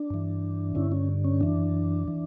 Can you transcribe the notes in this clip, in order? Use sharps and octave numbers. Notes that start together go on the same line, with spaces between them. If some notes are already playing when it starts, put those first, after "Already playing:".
Already playing: D4
G2 E3
G2 D3 C#4 E4
C#4
C#4
F#2 E3 D4
E3